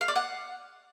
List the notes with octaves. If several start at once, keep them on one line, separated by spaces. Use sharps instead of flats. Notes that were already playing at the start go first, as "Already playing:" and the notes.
F5
D5
F#5